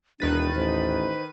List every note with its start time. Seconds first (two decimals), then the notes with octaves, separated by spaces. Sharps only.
0.20 E1 D#2 D#3 D4 B4 F#6 A6 D#7
0.56 A1 C5